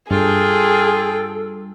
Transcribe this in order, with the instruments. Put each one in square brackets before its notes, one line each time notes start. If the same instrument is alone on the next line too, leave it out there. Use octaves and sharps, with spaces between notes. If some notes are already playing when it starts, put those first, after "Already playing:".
[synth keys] G2 [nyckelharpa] F4 G5 [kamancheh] G#4 [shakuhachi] A4